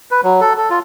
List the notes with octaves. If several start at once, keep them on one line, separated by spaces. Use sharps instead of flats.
B4
F#3
A4
A4
F4